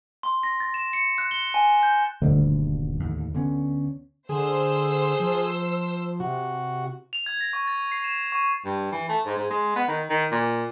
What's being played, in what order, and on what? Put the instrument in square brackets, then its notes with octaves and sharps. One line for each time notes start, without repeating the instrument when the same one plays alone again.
[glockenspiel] C6
A#6
A6
E7
C#7
F#6
G7
G#5
G6
[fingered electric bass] D#1 G2 [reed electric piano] D2
[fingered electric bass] D#2 A2
D3 B3 C#4
[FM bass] D3 [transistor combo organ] G#4 [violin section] C5 E6
[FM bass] F3
[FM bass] C3 [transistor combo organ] F#4
[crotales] F7
G#6
A#6
C#6
A6
C7
E7
C#6
[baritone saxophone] G2
E3
A3
G#2
G#2
G#3
B3
D#3
D#3
A#2